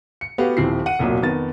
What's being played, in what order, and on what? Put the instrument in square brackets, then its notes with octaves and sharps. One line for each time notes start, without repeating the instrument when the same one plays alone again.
[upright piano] C#7
A3 B3 F#4 G4 F5
D#1 F3 C4 E4 C7
F#5 D#7
E1 C2 A#2 F#3
F2 D#3 B3 A6